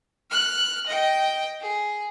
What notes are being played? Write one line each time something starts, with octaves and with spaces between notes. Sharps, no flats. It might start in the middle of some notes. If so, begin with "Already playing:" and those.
F6 F#6
D#5 G5
G#4